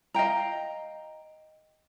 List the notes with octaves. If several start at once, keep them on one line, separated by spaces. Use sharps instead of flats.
D#5 F5 G5 A#5